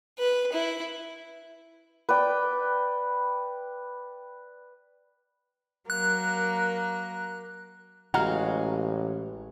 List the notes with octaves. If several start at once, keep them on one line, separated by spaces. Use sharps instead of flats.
B4
E4
B4 D5 G5
F#3 A#3 A#4 F#6
A1 G#3 F#4 F5 F#5 A#5 F6